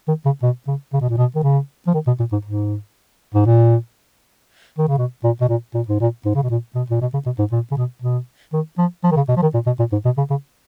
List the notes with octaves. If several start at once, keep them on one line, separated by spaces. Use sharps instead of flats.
D#3
C#3
B2
C#3
C#3
B2
A#2
B2
D#3
C#3
F3
D#3
B2
A#2
G#2
G#2
G#2
A#2
D#3
C#3
B2
A#2
B2
A#2
A#2
G#2
A#2
G#2
C#3
B2
A#2
B2
A#2
B2
C#3
B2
G#2
A#2
C#3
B2
B2
D#3
F3
F3
D#3
C#3
B2
F3
D#3
A#2
B2
A#2
G#2
B2
C#3
C#3